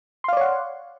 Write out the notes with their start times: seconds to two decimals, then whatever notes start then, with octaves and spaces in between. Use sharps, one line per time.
0.24 C6
0.28 F5
0.33 D5
0.37 C#5
0.41 F#5